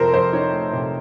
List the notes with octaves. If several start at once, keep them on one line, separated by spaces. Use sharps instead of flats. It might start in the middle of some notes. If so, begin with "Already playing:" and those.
Already playing: F2 C3 A#4 C5
F2 C5
D#3 C#5
A3
C3